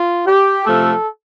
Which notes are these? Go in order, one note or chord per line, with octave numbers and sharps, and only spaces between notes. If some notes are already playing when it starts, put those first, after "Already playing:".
Already playing: F4
G4
C3 F3 A3 A4